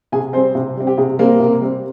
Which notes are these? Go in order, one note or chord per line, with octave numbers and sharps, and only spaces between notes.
C3 G#4 G#5
G3 C4 C5
C3
G3 C4
G4
C3 G#4
G3 A#3 C4 A#4
C3
G3 C4